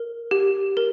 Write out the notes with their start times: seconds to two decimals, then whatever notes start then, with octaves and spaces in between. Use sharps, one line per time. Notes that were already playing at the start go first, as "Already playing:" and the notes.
Already playing: A#4
0.31 G4
0.77 A#4